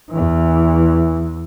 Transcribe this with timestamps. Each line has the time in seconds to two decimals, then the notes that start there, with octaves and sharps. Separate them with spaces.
0.10 E2 E3